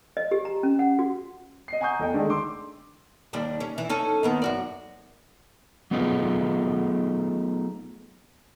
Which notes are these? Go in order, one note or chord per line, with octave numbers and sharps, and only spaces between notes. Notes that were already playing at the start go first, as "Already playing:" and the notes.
D#5
G4
A#5
C#4
F#5
F#4
D#5 C7
F#5 G#5 A#5 C#6 D#6 G6
E2 A4 D#5 G5
D3 D#3 G#3 A3 D4
C6 D6 E6
D#2 G3 D4
C#4
E3
C#4 D#4 A4
D#2 D#3 B3
F#2 F#4 D5
F#3 A3 B3 D#4 F4 G#4